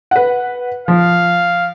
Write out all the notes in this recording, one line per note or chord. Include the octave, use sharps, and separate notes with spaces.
B4 F#5
F3 F5